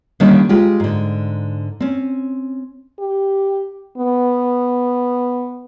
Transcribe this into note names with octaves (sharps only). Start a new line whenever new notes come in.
D3 D#3 G3 A#3 C#4 D#4
G#3 F4 G4
G#2 D3
C4 C#4
G4
B3